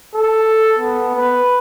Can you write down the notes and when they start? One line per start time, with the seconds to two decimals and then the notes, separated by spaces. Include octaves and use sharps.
0.15 A4
0.78 B3
1.15 B4